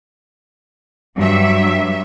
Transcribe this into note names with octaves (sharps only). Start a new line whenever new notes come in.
G2 F#3 E5